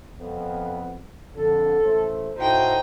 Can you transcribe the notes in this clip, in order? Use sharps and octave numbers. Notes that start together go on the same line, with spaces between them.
F2 B3
F2 D3 A4
A1 A3 C5
A2 D#4 F#4 C5 G5